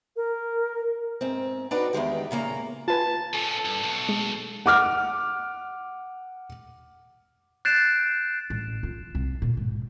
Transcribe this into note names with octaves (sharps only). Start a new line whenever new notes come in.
A#4
G#2 C4
D4 D#4 F#4 B4 D5 G5
E2 D#3 G#3 G4
A#2 C#3 A#3 A#5
F4 B4 G#5 A5
A#2 C#4 A4
G2
B1 B2
G#3
F#5 D6 F6
F#6 G6 A6 C7 D7 E7
A1
F4
C2
A#2
G#2